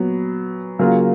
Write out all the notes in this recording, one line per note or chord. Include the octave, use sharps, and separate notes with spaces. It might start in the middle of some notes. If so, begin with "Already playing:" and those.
Already playing: A#2 F#3 B3
C#3 F#3 A#3 F4